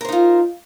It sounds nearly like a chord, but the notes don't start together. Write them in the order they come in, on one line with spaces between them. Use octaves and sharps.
A#4 C5 D#4 F4